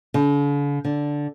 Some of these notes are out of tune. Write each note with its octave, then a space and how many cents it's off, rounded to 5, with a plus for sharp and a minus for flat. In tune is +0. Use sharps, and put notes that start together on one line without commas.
D3 -45
D3 -5